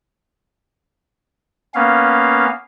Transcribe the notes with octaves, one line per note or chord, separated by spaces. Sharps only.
A#3 B3 C#4 F5